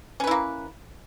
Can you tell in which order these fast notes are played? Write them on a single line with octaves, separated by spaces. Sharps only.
C#4 B4 E4 A#3